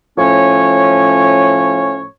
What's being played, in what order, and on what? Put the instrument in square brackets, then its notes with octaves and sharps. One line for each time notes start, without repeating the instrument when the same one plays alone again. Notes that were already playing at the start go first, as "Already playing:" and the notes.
[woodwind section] A2 F3 C#4 C#5